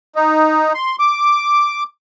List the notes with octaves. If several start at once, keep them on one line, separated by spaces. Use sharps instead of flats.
D#4
C6
D6